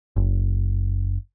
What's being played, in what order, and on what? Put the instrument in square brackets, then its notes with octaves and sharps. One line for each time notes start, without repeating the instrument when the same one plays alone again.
[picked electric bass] F#1